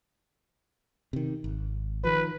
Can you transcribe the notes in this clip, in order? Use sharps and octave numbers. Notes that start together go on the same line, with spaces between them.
C3 D#3
G#1
D#3 F3 B4